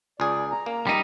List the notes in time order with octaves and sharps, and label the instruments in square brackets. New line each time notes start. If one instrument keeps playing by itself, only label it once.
[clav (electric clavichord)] C#2 G#4 [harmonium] D5
[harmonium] A#5
[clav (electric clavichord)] A#3
[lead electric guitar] G3 D#4